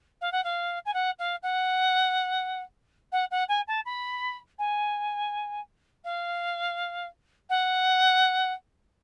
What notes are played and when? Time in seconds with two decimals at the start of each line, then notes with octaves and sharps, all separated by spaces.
0.21 F5
0.32 F#5
0.44 F5
0.85 G#5
0.93 F#5
1.19 F5
1.42 F#5
3.12 F#5
3.31 F#5
3.48 G#5
3.67 A5
3.85 B5
4.58 G#5
6.04 F5
7.49 F#5